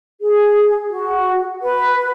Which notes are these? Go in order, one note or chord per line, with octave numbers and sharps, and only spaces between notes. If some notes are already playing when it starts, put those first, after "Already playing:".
G#4
F#4
B4